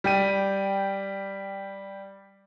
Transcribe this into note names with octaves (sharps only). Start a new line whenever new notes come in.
G3 G5 D#7